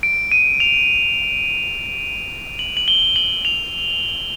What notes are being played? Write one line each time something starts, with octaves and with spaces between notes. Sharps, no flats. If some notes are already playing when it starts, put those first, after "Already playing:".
D7
D#7
F7
F#7
F#7
G7
F#7
F7